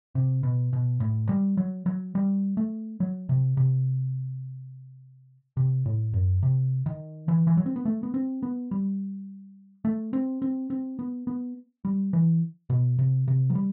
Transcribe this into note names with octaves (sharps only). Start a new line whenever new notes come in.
C3
B2
B2
A2
G3
F#3
F#3
G3
A3
F#3
C3
C3
C3
A2
F#2
C3
D#3
E3
E3
F#3
C4
B3
A3
B3
C4
B3
G3
A3
C4
C4
C4
B3
B3
G3
E3
B2
C3
C3
F#3
G3